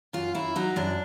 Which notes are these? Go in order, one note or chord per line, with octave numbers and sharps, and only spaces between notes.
F#2 F4
F#2 E4
F#3 D#4
F#2 D4